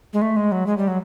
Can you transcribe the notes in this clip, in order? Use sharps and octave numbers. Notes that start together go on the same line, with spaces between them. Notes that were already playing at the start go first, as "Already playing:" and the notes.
G#3
A3
G#3
F#3
G#3
G3
F#3